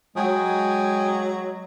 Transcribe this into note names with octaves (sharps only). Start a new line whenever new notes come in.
F#3 G#3 G5 G#5 D#6